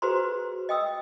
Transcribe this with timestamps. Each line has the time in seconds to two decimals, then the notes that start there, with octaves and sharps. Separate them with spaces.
0.02 F#4 G#4 B4 C5 A#5 C6
0.69 D#5 G5 D#6 E6